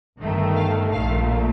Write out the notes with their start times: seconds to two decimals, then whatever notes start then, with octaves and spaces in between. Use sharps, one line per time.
0.19 G1 G2 D#3 A3
0.56 F5
0.92 A#1 A#2 A3 F5